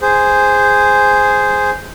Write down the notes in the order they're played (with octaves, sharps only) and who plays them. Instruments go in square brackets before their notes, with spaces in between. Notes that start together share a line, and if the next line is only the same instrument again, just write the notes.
[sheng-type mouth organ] G#4 C5